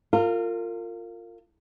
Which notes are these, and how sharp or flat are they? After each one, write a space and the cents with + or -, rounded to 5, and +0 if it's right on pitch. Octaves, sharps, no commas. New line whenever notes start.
F4 +0 A#4 -35